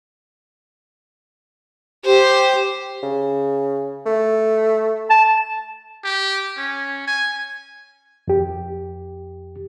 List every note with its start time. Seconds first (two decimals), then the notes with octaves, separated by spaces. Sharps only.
2.06 G4 C5
3.03 C#3
4.06 A3
5.10 A5
6.04 G4
6.57 C#4
7.07 G#5
8.28 F2 G4